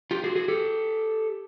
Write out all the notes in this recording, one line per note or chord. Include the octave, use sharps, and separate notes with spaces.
F4 G4
F#4 G#4
F#4 G#4
G4 A4